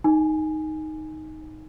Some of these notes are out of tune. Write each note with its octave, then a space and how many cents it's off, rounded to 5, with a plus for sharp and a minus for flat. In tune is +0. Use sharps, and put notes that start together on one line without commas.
D#4 +0 G#5 +0